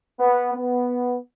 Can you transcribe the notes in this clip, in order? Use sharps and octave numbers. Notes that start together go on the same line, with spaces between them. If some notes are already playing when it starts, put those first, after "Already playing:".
B3
B3